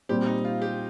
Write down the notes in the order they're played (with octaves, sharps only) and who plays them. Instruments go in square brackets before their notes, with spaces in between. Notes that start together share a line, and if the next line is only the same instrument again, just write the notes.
[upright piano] A#2 G3 C4 [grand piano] G4
[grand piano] D#4
F4
G4